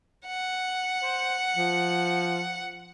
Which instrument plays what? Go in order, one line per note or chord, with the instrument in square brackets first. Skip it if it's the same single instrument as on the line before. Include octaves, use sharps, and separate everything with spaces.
[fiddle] F#5
[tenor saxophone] C5
F3